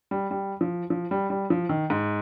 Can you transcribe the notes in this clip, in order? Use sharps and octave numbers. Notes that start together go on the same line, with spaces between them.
G3
G3
F3
F3
G3
G3
F3
D#3
G#2